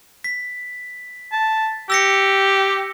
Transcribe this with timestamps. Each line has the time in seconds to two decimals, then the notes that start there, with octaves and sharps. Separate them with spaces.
0.24 B6
1.32 A5
1.90 G4 E6 A#6 C#7